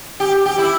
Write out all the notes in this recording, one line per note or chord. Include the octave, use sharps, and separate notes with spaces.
G4
G4
E4